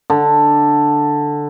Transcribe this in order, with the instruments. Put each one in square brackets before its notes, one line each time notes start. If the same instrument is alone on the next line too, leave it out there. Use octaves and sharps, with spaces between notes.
[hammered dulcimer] D3